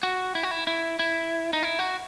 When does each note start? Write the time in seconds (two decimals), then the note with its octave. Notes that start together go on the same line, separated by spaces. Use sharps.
0.03 F#4
0.35 E4
0.43 F#4
0.51 E4
0.67 E4
0.99 E4
1.53 D#4
1.63 E4
1.79 F#4